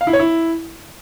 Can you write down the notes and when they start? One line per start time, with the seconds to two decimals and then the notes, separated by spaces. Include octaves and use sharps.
0.01 F5
0.07 E4
0.13 C#5
0.20 E4